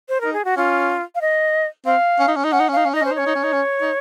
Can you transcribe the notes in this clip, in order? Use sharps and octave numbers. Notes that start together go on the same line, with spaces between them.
C5
D#4 A#4
G#4
F#4
C#4 F4
F5
D#5
C4 F5
C#4
D#4
C#4
D#4
C#4 F#5
D#4
C#4
D#4 F5
C#4
D#4 D#5
C#4
C5
D#4
C#4 C#5
D#4
C#4
D#4
C#4
D#4